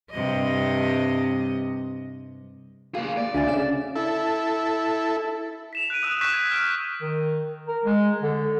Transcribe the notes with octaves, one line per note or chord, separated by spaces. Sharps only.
G2 C3 D#5
A#3 G#4 F5
D5
D2 E5 G#5 A6
C#3 E7
E4 A4
B6 E7 F7
F#6 D7 D#7
D#6 E6 F#6 F7
C#6 E6 F#6 G6 B6 E7
G#6
F6 G6 D7
D#3
A#4
G#3
D3